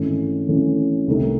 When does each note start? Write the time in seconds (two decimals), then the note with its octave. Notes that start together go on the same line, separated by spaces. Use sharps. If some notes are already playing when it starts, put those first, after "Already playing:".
Already playing: G#1 G#2 E3 A3 C#4
0.48 G#1 G#2 E3 A3 C#4
1.08 C2 C3 D#3 A3 D#4